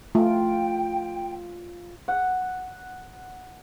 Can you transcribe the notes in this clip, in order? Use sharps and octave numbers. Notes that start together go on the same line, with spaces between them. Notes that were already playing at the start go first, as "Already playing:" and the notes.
A3 F4 G5
F#5